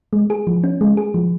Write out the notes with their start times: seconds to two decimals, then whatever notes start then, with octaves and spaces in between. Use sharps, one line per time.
0.13 G#3
0.30 G#4
0.47 F3
0.64 C#4
0.81 G#3
0.97 G#4
1.14 F3